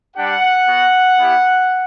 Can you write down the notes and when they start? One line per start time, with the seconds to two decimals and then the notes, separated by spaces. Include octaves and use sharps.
0.15 G3 D4 G4 F#5
0.66 B3 F#4
1.17 B3 E4 G4